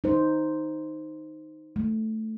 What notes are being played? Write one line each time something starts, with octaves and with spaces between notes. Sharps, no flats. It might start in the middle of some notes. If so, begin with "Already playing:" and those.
D#4 C5
A3